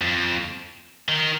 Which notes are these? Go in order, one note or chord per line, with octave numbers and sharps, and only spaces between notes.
F2
D#3